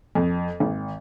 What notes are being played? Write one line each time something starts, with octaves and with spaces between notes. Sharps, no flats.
F2
G#1